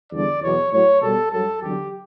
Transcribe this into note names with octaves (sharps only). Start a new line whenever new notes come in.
E2 D3 G3 D5
E2 B2 F#3 C#5
A2 F#3 C#5
B2 G3 A4
G2 F#3 A4
E2 D3 F#3 G4